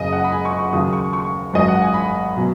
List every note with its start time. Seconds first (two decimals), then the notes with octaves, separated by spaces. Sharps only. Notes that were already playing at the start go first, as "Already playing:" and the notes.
Already playing: F#1 F#2 C#3 D#5
0.12 F#5
0.24 B5
0.32 G#5
0.45 C#6
0.59 C#6
0.72 D#2 C#3 F#3 D#6
0.93 C#6
1.13 C#6
1.53 G#1 F#2 F#3 D#5
1.68 F#5
1.82 G#5
1.94 B5
2.36 B2 F#3